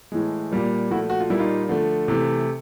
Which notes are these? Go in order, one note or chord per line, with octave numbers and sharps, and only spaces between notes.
A2 E3 G#3
A#2 G3 A#3
A#2 F3 A3 E4 F#4
F#4
F4
A#2 G3 A#3 E4
D#4 F4
D3 F3 A3
C3 E3 A3